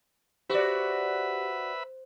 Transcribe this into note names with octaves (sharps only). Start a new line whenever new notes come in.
F#4 G4 B4 C5 D5 E5 B5